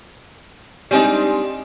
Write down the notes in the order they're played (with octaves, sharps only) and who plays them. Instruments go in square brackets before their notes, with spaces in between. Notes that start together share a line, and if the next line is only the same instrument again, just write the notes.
[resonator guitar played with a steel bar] G3 G#3 C4 D4 D#4